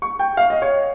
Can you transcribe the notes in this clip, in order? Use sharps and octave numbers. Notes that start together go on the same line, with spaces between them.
C#6
G5
F5
D#5
C#5